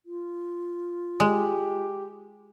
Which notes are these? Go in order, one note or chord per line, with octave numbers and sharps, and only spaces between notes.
F4
G#3 G4